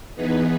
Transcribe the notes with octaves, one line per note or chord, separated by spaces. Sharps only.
E3 B3 D#4 G#4 B4